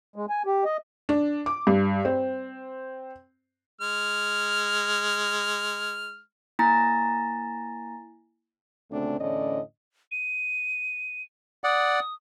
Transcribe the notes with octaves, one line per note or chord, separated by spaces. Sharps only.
G#3
G#5
G4
D#5
D4
D6
G2
C4
G#3 F6
A#3 E4 G#5 A#5 A6 A#6
D2 A#2 C#3 A3 C4 D4
E2 A2 D3 C#4 D5 D#5
D#7
D5 F#5 D#6